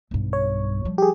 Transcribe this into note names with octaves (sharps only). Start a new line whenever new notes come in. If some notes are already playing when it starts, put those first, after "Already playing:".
B1 G2
C#5
F3 G3
G4 G#4